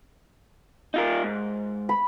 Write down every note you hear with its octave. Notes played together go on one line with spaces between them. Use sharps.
D#4 F4 A#4
G#2
B5